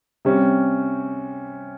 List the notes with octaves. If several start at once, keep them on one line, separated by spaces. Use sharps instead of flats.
C3 G3 C#4